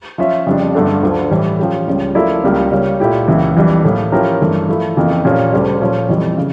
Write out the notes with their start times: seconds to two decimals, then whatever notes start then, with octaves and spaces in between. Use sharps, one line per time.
0.18 F3 C#4 F4 C#5 E5
0.47 F2 C#3 G3 D4
0.74 G2 D3 A3 D4 A4
1.03 D2 D3 F3
1.31 A2 E3 G3
1.59 F3 C#4 G4
1.87 C#2 C#3 G3 C#4
2.15 F3 A3 E4 A#4 D5
2.44 C#2 C#3 G3 A#3
2.71 C#3 G3 A#3 C#4
3.00 A#2 A3 E4 G4
3.28 C#2 C#3 E3 A#3 E4
3.56 F2 E3 G3 D4
3.84 A2 E3 A#3
4.12 F3 C#4 E4 G4 A#4
4.40 G2 E3 A3
4.69 F3 A3 E4
4.97 F2 C#3 E3 A#3
5.25 A#2 F3 A3 C#4 G4
5.52 D2 C#3 G3
5.81 A#2 F3 C#4
6.09 F2 E3 G3
6.37 C#3